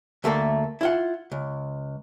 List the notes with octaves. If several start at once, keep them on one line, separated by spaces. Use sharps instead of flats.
D2 A3 A#3 A4
E4 F4 F#5
C#2